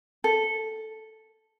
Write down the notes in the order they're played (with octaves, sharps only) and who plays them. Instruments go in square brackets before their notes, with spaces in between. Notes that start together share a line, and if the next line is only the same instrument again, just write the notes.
[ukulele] A4